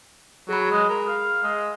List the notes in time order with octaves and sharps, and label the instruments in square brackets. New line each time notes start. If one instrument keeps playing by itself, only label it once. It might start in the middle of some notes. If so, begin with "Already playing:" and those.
[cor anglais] F#3 [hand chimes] G#4 B5
[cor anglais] G#3
A#4
F5
G#3